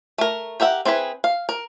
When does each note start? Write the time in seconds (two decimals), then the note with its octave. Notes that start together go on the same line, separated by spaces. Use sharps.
0.18 A3 A#4
0.60 G4 A#4 E5 F#5
0.85 C4 E4 G#4 B4
1.24 F5
1.49 A#4